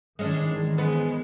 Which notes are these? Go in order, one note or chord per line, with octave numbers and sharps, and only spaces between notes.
D#3 E3 G#3 C#4 D4
G#3 B3